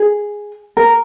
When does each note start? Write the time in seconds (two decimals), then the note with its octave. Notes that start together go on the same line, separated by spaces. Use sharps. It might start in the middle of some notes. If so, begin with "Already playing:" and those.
Already playing: G#4
0.77 A#4